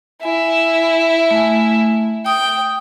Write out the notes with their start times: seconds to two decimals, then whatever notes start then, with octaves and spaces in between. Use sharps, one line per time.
0.23 E4 G#5
1.31 A3 G#5
2.26 G5 D#6